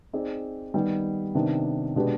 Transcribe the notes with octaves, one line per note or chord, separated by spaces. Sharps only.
C4 D#4 G#4 D5
D#3 G3 B3 D#4 G4
C3 D#3 B3 D4
B2 G#3 D4 G4 B4